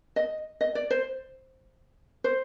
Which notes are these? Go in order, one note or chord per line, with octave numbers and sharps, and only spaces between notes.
D#5
D#5
D5
C5
C5